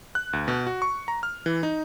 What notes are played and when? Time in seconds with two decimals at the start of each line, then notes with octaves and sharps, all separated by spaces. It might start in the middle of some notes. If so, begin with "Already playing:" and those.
0.15 F#6
0.33 D2
0.48 B2
0.67 F#4
0.82 C#6
1.08 A#5
1.23 F6
1.46 E3
1.63 D#4